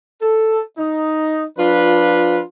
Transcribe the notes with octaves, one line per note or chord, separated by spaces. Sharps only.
A4
D#4
F3 D4 F4 B4